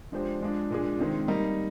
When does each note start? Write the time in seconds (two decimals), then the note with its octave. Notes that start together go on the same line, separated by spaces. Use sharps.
0.12 F3 G#3 D4 G4 C5
0.41 F3 G#3 D4
0.70 A#2 G#3 D4 G#4
0.99 C3 D#3 G#3 C4
1.27 G3 A#3 D#4